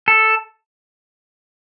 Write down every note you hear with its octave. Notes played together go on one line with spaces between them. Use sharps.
A4